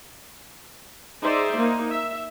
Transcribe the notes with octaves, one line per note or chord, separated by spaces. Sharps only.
D#4 G#4 C5 D5 E5
A#3 D#4
E5